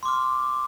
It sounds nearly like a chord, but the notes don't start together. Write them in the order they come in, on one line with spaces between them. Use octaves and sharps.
C6 D6 F6